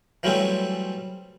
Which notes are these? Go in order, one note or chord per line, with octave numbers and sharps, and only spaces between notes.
E3 F#3 G3 A3 C4 C#4